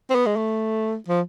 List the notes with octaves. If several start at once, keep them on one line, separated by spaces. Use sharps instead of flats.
C4
B3
G#3
A3
F3